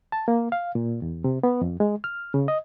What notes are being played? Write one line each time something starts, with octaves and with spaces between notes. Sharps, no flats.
A5
A#3
F5
A#2
E2
C3
B3
F2
G#3
F6
C#3
D#5